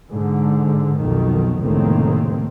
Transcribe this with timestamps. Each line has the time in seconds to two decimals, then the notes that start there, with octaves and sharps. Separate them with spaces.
0.11 G#2 D3
0.99 B1 F2 B2 D#3
1.62 F1 C#2 A2 D#3 A#3 C4